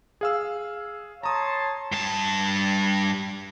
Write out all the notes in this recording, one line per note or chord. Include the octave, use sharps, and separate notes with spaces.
G#4 F5 E6
C#5 A5 A#5 C6 D#6
G2 A5